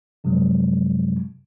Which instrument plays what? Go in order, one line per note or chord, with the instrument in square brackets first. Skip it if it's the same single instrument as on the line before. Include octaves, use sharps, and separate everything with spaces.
[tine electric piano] F#2 C3 F3 F#3 G#3